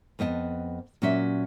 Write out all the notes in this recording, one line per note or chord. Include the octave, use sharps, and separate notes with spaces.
F2 B3 D#5 G5 A5
A#2 F#3 C#4 E5